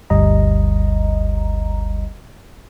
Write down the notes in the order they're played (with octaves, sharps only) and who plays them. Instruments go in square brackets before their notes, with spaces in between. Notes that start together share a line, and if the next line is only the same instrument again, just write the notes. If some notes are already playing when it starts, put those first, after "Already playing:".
[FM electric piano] G1 D2 G3 D#5 A#5